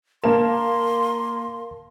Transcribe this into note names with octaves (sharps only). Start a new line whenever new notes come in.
A#3 A#4 F5 A5 C6 E7